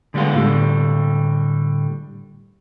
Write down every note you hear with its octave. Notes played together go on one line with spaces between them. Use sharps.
D3 G3 G#3 B3 F4
A2 D3 G3